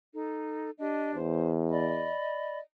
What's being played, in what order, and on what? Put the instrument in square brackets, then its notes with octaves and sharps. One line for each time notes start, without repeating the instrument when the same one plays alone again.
[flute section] D#4 A4
D4 G4 D#5
[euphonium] E2 [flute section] C5
[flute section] D5 D#5 B5